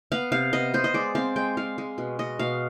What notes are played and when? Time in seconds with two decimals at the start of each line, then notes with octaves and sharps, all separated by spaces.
0.12 B3 F5
0.32 C3 F5
0.53 B3 D#5
0.74 B3 C5
0.84 D#5
0.94 G#3 D5
1.15 C4 F5
1.36 G#3 G5
1.57 G#3 F5
1.78 G#3
1.98 B2
2.19 B2 D#5
2.39 B2 F5